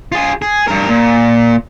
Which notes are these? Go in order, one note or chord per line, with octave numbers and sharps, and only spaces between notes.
F4 G#4
G#4
G2 A#4
A#2